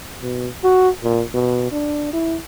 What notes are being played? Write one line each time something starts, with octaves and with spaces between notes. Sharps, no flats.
B2
F#4
A#2
B2
D4
E4